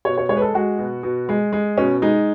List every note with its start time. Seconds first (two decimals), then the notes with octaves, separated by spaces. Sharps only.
0.05 B2 C#5
0.18 C#5
0.29 G#3 C#5
0.37 B4
0.42 A4
0.54 G#3 F#4
0.79 B2
1.03 B2
1.29 G#3
1.53 G#3
1.77 B2 C#4
2.02 G#3 D#4